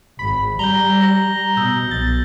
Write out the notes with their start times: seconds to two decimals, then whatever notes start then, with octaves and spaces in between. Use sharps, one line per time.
0.19 G#1 B5
0.59 G3 A#5 G6 F#7 G7
1.01 A#6 F#7
1.57 B2 D#6 E6 G6
1.91 B1 A6